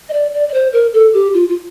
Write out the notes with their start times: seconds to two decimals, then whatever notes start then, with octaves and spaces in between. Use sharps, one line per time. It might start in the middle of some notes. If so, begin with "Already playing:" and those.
0.09 D#5
0.13 D5
0.34 D5
0.49 D5
0.54 C5
0.73 A#4
0.93 A4
1.14 G4
1.34 F4
1.49 F4